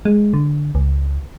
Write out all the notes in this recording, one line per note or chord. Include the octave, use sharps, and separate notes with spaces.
G#3
D3
C#2